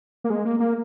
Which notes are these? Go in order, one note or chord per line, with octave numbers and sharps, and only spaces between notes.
A#3
G#3
A#3
A#3